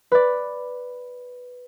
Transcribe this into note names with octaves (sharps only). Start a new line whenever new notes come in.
B4 D5